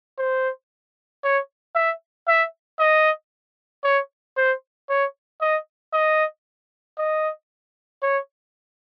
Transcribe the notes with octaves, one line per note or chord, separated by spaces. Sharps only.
C5
C#5
E5
E5
D#5
C#5
C5
C#5
D#5
D#5
D#5
C#5